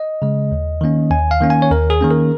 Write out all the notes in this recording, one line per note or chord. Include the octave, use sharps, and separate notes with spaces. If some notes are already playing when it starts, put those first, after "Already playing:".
Already playing: D#5
C#3 G#3
D#2
D#3 A#3 C#4
D#2 G#5
F5
D#3 A#3 C#4
G#5
C#5
D#2 A#4
G#4
D#3 A#3 C#4
A#4